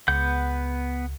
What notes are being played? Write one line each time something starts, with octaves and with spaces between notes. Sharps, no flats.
C#2 B3 F#5 G6